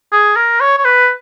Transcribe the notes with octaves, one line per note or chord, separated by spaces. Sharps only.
G#4
A#4
C#5
C#5
B4